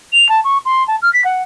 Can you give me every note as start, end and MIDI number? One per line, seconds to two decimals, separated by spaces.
0.12 0.28 101
0.29 0.40 81
0.44 0.58 85
0.65 0.86 84
0.88 0.96 81
1.02 1.11 89
1.13 1.22 95
1.24 1.42 78